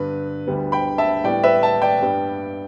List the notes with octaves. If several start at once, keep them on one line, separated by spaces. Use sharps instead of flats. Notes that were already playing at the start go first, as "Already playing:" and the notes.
Already playing: G2 D3 B3 B4
D2 D3 G3 B3
G5 B5
E5 A5
A2 G3 B3 D5 G5
B4 E5
E5 A5
D5 G5
G2 G3 B3